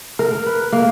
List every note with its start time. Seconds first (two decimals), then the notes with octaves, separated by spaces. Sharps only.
0.19 A#4
0.46 B4
0.73 A#3